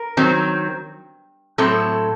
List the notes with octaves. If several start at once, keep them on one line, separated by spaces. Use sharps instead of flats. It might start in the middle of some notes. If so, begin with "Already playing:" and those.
Already playing: A#4
D#3 F#3 C4
A2 F#3 C4 A4